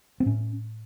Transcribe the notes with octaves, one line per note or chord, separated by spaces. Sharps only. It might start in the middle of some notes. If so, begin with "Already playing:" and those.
C4
A2 C#4